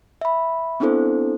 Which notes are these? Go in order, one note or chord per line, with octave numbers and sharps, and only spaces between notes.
E5 B5
B3 C4 D4 E4 A4 C5